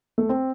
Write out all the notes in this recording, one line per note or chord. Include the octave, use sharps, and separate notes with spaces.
A3
C4